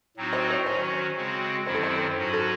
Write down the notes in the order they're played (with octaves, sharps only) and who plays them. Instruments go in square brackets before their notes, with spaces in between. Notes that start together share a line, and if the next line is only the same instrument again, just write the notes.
[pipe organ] A2 F#3 C4 D#4 F#4
[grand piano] C5
C#5
[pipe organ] D#3 F#3 C#4 F#4 [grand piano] C5
[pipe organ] C#3 G#3 C4 F#4
[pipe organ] F#2 D#3 F#3 C4 E4 [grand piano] C5
[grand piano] A4
C5
[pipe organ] G#2 F#3 C#4 F#4
[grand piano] A4